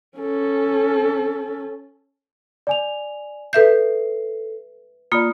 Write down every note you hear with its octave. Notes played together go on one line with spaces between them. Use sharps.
C#4 A4
D5 G#5 F7
A4 B4 E5 G6 C7
A#3 F4 D5 B5 D#6